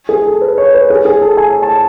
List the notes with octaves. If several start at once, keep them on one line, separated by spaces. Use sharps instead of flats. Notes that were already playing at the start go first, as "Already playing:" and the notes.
G#4
A4
B4
C#5
B4
G#4
G#4
A4
G#5
A5